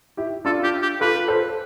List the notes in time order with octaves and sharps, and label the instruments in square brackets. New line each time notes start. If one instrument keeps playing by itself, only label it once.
[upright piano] E4 G4
[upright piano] D4 F4 [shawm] A4
[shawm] G4
G4
[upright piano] F4 A4 [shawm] B4
[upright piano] A4 C5